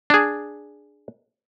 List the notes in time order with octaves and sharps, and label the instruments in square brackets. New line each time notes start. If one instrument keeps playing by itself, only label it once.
[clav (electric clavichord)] D4 G#4